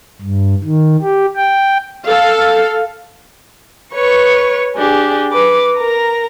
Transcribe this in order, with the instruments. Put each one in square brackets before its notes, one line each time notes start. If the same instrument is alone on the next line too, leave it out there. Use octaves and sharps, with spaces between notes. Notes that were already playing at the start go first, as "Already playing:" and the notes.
[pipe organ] G2
D#3
G4
G5
[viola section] A4 F5
[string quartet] B4 C#5 C#6
D4 G4 G#4
B4 D6
A#4 A#5